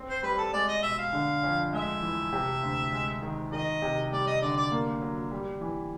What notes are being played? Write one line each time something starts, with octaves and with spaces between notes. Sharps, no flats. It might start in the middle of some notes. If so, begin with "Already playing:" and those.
Already playing: C4
C5
G3 B4
A4
G#3 D5
D#5
B2 E5
F5
D3
F2
G#3 E5
E3
C3
D2
G#3
D#3
D#3 D#5
C3
G3 D5
D#5
D3 D5
D5
A#3
F#3
G3
E3